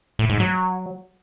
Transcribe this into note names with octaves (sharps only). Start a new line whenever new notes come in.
A2
G#2
F#3